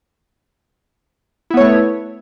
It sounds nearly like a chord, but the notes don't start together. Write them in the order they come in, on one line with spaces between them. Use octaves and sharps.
E4 B3 C#5 A3